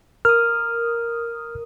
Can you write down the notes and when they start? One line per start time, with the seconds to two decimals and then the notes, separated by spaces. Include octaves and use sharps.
0.25 A#4 D#6 F6